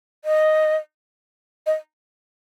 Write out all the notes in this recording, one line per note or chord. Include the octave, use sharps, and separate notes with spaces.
D#5
D#5